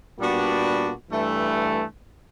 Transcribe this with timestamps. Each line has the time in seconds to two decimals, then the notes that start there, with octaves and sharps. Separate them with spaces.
0.18 A#2 G3 B3 D4 F#4
1.10 G2 E3 A3